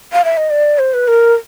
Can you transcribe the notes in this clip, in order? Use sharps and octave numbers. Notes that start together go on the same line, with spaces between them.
F5
E5
D#5
D5
C5
B4
A#4